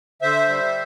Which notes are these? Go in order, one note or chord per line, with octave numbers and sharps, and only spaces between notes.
D3 C5 E5
G3